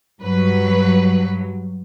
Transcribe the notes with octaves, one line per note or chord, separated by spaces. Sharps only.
G2 F#3 B4